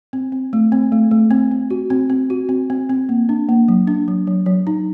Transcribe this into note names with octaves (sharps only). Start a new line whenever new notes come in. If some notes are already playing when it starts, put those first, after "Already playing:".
C4
C4
A3
C4
A3
A3
C4
C4
F#4
C4
C4
F#4
C4
C4
C4
A#3
D4
A#3
F#3
D4
F#3
F#3
F#3
D#4